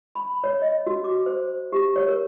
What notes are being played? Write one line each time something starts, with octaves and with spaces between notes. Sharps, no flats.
B5
C#5
D#5
F#4
D6
C5
G4
C#5
A#4